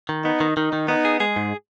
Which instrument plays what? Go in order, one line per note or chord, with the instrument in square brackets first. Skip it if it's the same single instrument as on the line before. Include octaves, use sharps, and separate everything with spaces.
[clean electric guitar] D#3
[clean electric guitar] B3 [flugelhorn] D#4
[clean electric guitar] D#3
[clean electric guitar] D#3 [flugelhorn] D#4
[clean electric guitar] D#3
[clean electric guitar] B3 [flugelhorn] D#4
[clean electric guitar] G#4
[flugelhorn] G#3 [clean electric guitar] G#4
[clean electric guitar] G#2